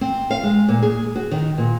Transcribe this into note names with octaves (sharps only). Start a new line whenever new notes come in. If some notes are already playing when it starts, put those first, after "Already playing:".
C4
F5
G#3
A#2
G#4
F#4
D#3
A#2